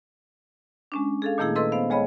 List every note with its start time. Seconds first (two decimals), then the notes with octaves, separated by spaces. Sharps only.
0.92 G#3 C#4 D4
1.22 G#4 A4 F5
1.38 A#2 D#3 A3 A#3 E4 G#4
1.56 A4 B4 D#5 C6 E6
1.72 B3 C5 F5
1.90 D2 G#3 G#4 C#5 D#5 B5